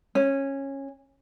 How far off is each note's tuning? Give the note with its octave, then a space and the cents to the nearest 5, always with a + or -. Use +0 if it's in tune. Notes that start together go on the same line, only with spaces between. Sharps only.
C#4 -15